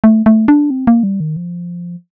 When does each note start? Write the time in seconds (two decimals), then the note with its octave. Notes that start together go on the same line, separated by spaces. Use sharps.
0.04 A3
0.26 A3
0.48 D4
0.70 C4
0.87 A#3
1.03 G3
1.20 D#3
1.36 F3